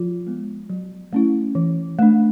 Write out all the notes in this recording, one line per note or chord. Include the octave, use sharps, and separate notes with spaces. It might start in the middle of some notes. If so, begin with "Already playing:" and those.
Already playing: F3 F4
G#3 B3
F#3
A3 C#4 E4
E3
A3 D4